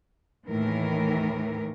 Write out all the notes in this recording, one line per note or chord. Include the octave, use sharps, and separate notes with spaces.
D#2 A2 D#3 E3 A#4